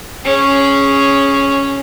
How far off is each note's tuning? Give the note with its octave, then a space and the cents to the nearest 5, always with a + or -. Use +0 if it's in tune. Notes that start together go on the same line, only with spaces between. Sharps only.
C#4 +0 G#4 +0